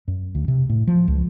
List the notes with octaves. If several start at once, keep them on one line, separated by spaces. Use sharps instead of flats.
F#2
D2
C3
A2
F3
C#2